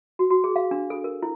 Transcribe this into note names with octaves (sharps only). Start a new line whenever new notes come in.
F#4
F#4
G#4
F5
D4
A4
A#4
E4